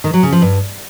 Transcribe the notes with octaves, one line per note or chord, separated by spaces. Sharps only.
D#3
F#3
C#3
F3
G2